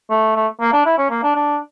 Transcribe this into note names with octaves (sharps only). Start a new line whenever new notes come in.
A3
A3
A#3
D4
E4
C#4
A#3
D4
D4